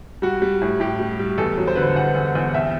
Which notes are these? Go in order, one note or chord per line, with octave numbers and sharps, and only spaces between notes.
G3 F#4
G3
A2
A2 G4
G3
G3
E2 A4
F#3
C5
D3 B4
C5
E2 F#5
E2
E2
C2 E5